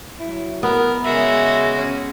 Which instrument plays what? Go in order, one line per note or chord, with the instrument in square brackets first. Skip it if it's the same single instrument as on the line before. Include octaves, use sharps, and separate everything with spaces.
[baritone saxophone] F#3 [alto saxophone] E4
[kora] B3 [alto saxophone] A#4
[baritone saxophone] C#3 [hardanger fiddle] G#3 F#4 [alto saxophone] E5
[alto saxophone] C#4